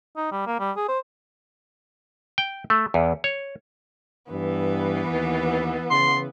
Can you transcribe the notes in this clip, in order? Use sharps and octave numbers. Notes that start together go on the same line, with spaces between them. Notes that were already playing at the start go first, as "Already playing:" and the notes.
D#4
G3
A#3
G3
G#4
C5
G5
A3
E2
C#5
G2 E3 B3 B4
D#2
C#3 C6